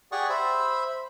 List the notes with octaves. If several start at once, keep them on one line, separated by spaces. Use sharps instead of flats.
G4 G#4 D5 F#5 C#6 D#6
C5 E5 B5